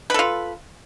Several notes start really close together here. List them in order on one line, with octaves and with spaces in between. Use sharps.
B4 A4 F4